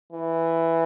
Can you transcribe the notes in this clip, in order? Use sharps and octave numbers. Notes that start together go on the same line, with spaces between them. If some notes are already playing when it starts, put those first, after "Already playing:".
E3